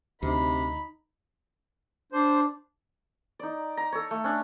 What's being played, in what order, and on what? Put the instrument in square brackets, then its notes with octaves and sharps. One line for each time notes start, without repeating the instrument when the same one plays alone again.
[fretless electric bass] D2 [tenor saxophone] C3 [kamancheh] D#4 B5
[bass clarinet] D4 [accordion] C5
[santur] D#4 D5
A#5
A4 C#5
A3
C#4 D4